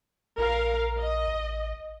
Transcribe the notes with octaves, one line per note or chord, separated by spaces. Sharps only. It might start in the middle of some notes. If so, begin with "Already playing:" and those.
A#1 A#4 F5
D#5
A1